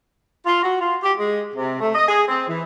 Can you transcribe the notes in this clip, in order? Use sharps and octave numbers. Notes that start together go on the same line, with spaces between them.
F4
F#4
F4
G4
G#3
C3
A3
D#5
G#4
C4
E3